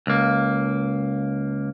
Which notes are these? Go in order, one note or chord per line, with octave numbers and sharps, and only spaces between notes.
C#2 A#3